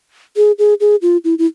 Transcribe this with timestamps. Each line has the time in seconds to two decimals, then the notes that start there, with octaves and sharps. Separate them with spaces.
0.36 G#4
0.59 G#4
0.80 G#4
1.02 F4
1.24 E4
1.39 E4